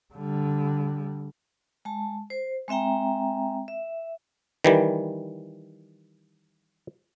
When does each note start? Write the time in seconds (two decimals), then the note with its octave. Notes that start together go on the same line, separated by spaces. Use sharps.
0.14 D3 G3
1.85 G#3 A5
2.30 C5
2.68 G#3 C4 E5 G5 A#5
3.68 E5
4.64 D#3 E3 G3